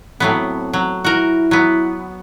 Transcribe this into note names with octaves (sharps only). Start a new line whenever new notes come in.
A2 F#3 B3 C4
F#3
E4 F#4 A#4
F#3 B3